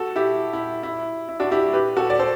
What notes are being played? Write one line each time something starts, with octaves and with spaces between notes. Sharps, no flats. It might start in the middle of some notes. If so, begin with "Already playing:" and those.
Already playing: F#4 A4
E4 G4
E4
E4
E4
D4 F#4
E4 G4
G4 B4
F#4 A4
D5
A4 C5